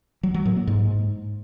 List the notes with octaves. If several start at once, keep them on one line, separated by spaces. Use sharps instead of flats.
F#3
F#3
A2
A#3
G#2